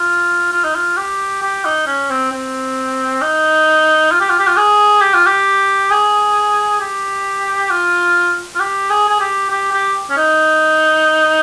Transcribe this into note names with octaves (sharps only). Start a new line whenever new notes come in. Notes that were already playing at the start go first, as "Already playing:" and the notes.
Already playing: F4
F4
D#4
F4
G4
G4
D#4
C#4
C4
C4
D#4
F4
G4
F4
G4
F4
G#4
G4
F4
G4
G#4
G4
F4
F4
G4
G#4
G#4
G4
G4
G4
C#4
D#4